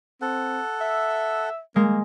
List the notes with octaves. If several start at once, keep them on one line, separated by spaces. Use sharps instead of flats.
C4 A4 F#5
E5
G#3 A#3